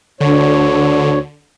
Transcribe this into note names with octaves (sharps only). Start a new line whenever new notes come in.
D2 D3 C#5